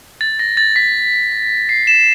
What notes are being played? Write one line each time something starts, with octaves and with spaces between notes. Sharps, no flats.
A6
A#6
A6
B6
C7
E7